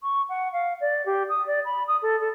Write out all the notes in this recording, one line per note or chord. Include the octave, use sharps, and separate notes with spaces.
C#6
F#5
F5
D5
G4
D#6
D5
B5
D#6
A4
A4